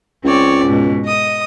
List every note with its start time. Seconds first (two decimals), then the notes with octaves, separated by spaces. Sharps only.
0.24 C#2 C4 C#5 D5
0.64 G#2 B2
1.04 D#5 D#6